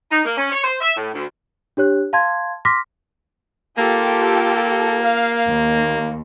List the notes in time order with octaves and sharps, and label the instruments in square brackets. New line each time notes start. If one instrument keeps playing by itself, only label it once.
[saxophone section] D#4
A#3
C#4
C#5
C5
E5
A2
D2
[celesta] D4 G4 C#5 F#6
F5 A5 C6 G#6
C6 D6 F6 A#6 B6
[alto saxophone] A#3 [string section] F4 G4 A4
[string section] F5
D#2